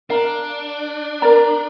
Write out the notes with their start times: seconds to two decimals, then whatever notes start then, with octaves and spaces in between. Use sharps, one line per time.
0.10 D4 A#4 F5 A#5
1.22 A#4 D5 A#5